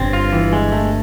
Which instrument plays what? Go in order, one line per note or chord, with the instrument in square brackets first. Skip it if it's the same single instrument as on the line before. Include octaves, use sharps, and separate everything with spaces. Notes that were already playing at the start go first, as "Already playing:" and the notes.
Already playing: [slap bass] G1 G2 [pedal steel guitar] C4
[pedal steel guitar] F4
E3
G#3
A3